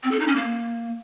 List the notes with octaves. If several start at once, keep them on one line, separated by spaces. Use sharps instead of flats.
C4
A4
D#4
C#4
A#3